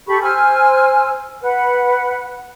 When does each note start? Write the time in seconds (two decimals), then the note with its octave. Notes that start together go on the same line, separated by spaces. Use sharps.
0.07 G4 A4 B5 C#6
0.22 C5 G#5 E6 F6
1.41 B4 F#5